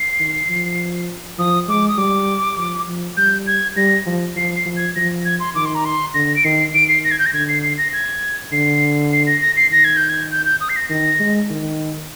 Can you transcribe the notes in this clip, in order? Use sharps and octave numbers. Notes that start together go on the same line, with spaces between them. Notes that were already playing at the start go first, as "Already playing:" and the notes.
Already playing: C7
D#3
F3
F3 D#6
G#3 D6
D#6
G3 D6
F3
F3
G3 G6
G#6
G3 A#6
F3
F3 C7
C7
F3
G#6
F3 A#6
G#6
C6
D#3 D6
C6
A#5
C6
D3 A#6
D7
D#3 C7
D#3 D7
C7
A#6
G#6
G6
A#6
D3 G#6
C7
C7
A#6
G#6
D3 C7
C7
A#6
A#6
C7
D#3 A#6
G#6
G6
G#6
G6
G6
D#6
C7
A#6
D#3 A#6
G#3
D#3